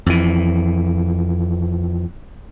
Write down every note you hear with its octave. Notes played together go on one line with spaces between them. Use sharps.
F2 E3